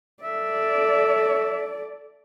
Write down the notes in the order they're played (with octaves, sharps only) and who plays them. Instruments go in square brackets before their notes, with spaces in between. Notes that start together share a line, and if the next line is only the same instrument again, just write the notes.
[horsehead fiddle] A4 D5 [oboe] E5